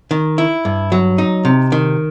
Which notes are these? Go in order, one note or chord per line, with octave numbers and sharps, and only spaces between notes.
D#3
E4
G2
F#3
D#4
C3
D#3